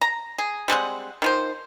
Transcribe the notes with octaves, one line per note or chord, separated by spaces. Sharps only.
A#5
G#4
G3 G#3 C4 F#5
D#3 F3 C5